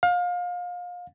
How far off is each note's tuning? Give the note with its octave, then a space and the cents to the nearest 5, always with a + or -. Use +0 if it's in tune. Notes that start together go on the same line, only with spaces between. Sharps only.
F5 +30